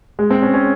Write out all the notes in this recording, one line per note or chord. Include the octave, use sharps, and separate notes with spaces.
G#3
C4
C#4
C#4